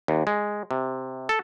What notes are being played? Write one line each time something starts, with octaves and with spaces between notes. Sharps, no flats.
D#2
G#3
C3
A4